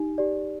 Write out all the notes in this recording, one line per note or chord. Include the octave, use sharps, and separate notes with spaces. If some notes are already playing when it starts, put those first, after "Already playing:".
Already playing: D#4 G4
G4 D5